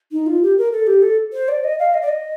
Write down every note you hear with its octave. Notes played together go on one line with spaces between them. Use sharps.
D#4
F4
G4
A#4
A4
G4
A4
C5
D5
D#5
F5
D#5
D5
D#5